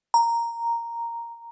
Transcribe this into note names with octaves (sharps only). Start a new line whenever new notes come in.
A#5